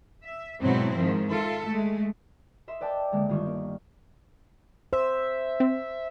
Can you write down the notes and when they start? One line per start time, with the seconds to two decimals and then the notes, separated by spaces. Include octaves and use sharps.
0.23 E5
0.62 G#2 B2 F#3 C4 E4
0.97 G#2 D#3 F3
1.28 F4 A4 E5
1.66 G#3 A3
2.68 D#5 E5 C6
2.81 B4 D5 G5 A5
3.12 C#2 D3 G#3 A#3
3.29 G1 D#3 F4 C#6
3.46 A#3
4.93 C5 E5
5.60 C4